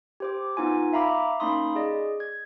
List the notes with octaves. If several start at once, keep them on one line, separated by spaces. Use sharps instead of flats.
G4 C5 D6
B3 D#4 F4 G#5
E5 F5 A#5 B5 D6
A#3 C#4 D#4 B5 C6 D#6
G#4 D5 D#5
G#6